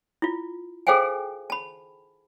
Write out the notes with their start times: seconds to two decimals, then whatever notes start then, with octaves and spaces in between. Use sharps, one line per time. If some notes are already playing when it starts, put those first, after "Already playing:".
0.22 E4 F4
0.87 G#4 A4 C5 F5 G5 G#5
1.50 A5 B5